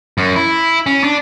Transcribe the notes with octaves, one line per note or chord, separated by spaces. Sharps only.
F#2
E4
C#4
D4